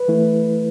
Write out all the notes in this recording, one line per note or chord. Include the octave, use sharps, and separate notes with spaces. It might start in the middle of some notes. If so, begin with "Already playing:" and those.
Already playing: B4
E3 A3 E4